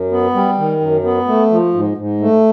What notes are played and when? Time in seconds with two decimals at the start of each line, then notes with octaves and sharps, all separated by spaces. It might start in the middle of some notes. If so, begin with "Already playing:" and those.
Already playing: F#2
0.12 B3
0.34 G3
0.58 D#3
0.81 F#2
1.04 B3
1.27 A3
1.51 F3
1.74 G#2
1.98 G#2
2.21 A3